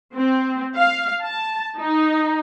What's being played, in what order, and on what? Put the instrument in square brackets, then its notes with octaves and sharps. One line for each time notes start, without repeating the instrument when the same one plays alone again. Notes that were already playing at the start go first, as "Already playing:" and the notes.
[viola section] C4
F5
A5
D#4